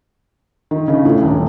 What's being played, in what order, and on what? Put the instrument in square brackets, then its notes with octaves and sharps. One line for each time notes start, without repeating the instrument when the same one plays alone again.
[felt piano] D#3
C#3
A2
D#1